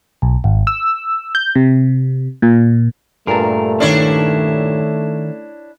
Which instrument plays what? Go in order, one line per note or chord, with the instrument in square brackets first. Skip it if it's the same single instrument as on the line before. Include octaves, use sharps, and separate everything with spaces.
[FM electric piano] B1
G#1
E6
G6
C3
A#2
[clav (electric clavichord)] G2 A#2 A5 [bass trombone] A3 [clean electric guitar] G#4 A#4
[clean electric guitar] D#3 C#4 [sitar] D4 E4 C#5